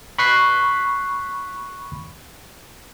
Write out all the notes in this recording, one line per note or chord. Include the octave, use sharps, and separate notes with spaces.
B5 C#6 F#6 B6 C7